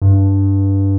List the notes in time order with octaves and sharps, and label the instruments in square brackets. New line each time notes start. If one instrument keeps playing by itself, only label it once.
[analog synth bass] G2